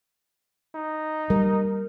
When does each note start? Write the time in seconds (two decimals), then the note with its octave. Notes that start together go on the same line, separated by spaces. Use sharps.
0.75 D#4
1.30 G3 A#4